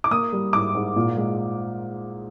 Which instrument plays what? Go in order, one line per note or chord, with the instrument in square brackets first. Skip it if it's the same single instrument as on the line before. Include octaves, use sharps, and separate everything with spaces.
[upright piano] D6
A#3 D#6
G3
G#2 D6
G#2
A#2
G#3